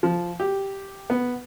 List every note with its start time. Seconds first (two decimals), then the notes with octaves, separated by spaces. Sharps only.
0.03 F3
0.40 G4
1.10 B3